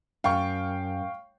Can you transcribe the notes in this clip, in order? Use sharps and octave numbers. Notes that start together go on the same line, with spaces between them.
F#2 F5 G5 C#6